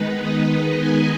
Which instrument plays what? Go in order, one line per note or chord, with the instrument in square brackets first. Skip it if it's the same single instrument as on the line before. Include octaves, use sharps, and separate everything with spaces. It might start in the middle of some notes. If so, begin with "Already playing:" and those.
Already playing: [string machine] D#3 G#3 B3 D#4 B4
D#5
G#5